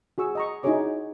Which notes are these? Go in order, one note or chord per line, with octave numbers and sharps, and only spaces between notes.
F#4 G#4 C#6 E6
D#5 A#5 C#6
D#4 E4 F#4 G#4 C#5 D6